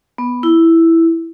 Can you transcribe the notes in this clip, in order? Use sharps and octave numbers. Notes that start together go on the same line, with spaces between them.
B3
E4